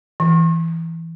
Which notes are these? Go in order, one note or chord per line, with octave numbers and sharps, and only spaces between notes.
E3